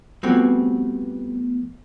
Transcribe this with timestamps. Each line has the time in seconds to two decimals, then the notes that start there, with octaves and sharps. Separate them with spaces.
0.23 F3 G3 A3 B3 C4 F#4